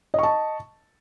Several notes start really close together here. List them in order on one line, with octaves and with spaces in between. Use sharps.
D#5 C#6 A5